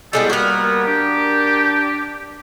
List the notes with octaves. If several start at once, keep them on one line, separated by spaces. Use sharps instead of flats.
A2 G3 G#3 B3 A4 G5
G3 A#3 B3 F#4 A#4
D4 G4